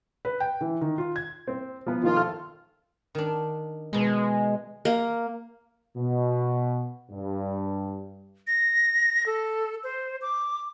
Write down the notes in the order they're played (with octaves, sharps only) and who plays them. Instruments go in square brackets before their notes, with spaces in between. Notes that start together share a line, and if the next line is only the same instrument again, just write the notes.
[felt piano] B4
G5
E3
D#3
F4
G#6
[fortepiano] C4
F3 B3
[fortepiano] D#3 F3 [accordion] F4
[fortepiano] A4 F6
[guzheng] D#3 D4
[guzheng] B2 C6 [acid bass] G#3
[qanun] A#3
[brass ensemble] B2
G2
[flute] A#6
A4
C5
D6